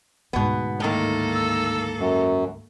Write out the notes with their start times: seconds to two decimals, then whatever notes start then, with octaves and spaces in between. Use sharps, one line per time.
0.33 D2 G#2 B2 B3
0.80 A2 D#3 A#3 A4
1.35 E6
1.99 F#2